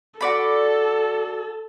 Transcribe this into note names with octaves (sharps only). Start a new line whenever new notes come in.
F#4 A4 D5 B5